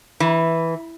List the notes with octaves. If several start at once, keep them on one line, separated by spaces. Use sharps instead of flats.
E3